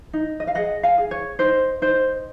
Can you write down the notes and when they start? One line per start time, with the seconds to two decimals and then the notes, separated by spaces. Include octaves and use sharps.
0.13 D#4
0.40 D#5
0.47 F5
0.55 G#4 D#5 F#5
0.83 F5 G#5
0.98 G#4
1.11 C#5
1.39 D#4 C5
1.82 D#4 C5